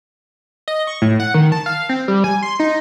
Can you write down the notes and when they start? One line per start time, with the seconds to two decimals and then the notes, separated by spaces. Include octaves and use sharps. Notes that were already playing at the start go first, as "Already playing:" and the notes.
0.68 D#5
0.87 C#6
1.02 A2
1.20 F#5
1.34 D#3
1.52 A5
1.66 F5
1.89 C4
2.08 G3
2.24 G#5
2.43 C6
2.60 D#4